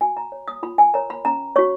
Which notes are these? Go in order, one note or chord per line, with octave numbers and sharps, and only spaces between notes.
F#4 G#5
A#5
C#5
D#6
F4 B5
G#5
A#4 C#5 A#5
B5
C#4 A#5
F#4 C#5 C#6